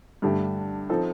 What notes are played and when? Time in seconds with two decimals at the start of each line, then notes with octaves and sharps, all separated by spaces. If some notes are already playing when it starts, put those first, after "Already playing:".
0.22 G2 D3 A3 D4 G4
0.89 F3 C4 D#4 A4